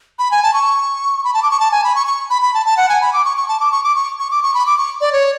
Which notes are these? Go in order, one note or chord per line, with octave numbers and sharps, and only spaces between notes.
B5
G#5
A5
C#6
B5
A5
D6
C#6
A5
G#5
B5
C#6
C#6
B5
B5
A5
A5
F#5
G#5
B5
D6
C#6
C#6
A5
D6
C#6
D6
C#6
C#6
D6
C#6
B5
D6
C#6
D5
C#5